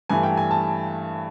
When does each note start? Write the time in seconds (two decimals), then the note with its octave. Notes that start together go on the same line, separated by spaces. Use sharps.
0.09 G2 E3 A3 G#5
0.23 G5
0.37 G#5
0.51 A5